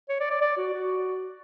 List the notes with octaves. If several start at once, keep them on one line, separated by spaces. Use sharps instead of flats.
C#5
D5
D5
D5
F#4
F#4